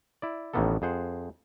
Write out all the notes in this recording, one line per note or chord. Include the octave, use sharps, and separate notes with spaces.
E4 D5
A1 A2 D#3 A#3 B3 A4
F2 G#4 C5 F#5